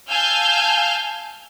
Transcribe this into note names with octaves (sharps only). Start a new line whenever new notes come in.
F5 G#5 A5 E6 F6 G6